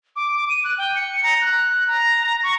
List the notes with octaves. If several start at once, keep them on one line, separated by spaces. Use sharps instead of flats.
D6
D6
D#7
F#6
G5
C#7
A#5
F#6
A#5
C#6